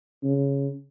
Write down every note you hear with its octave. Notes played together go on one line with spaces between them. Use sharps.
C#3